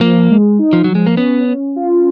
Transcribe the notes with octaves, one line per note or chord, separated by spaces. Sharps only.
F3 A#3
G#3
D#4
F3
F3 F#3
G#3
A#3
B3 C#4
C#4
F4